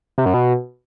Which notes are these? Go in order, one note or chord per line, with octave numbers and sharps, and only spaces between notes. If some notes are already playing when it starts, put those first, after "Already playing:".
C3
F#2
B2